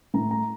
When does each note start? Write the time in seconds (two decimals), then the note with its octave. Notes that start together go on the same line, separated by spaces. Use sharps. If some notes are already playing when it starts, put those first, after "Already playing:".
0.14 A2 A#5
0.31 A#5